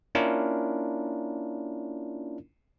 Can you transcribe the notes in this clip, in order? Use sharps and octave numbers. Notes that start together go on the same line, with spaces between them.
A#3 C#4 D4 E4 F4 A#4